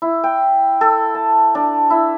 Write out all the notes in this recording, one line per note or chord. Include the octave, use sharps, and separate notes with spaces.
E4
G5
A4
A5
D4
E4